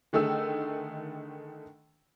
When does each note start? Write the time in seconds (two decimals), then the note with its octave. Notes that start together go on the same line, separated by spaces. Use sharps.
0.13 D3 D#3 A3 G#4 E6